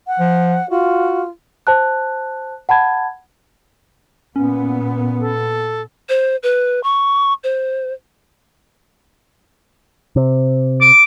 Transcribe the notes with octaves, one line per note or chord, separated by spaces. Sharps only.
F#5
F3
F4 F#4
C5 A5 F#6
F#5 A5 B5 G#6
A#2 B3 C#4
A4
C5
B4
C#6
C5
C3
D6